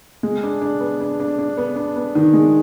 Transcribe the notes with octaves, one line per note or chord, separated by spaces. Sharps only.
G#3
D4
D4
B3
D4
D4
D4
B3
D4
B3
D#3
G#3